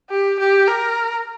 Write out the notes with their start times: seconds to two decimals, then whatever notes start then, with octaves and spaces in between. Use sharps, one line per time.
0.10 G4
0.39 G4
0.67 A#4